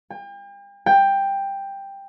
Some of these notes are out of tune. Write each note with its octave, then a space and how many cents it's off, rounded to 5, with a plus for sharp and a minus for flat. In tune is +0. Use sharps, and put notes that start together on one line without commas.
G5 +40
G5 +10